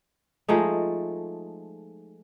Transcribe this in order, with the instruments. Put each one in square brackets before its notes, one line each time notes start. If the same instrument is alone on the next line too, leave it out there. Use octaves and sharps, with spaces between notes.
[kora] F3 G#3 A3 D#4